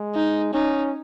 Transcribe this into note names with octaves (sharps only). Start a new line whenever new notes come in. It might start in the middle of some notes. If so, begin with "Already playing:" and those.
Already playing: G#3
D#4
C#4 D#4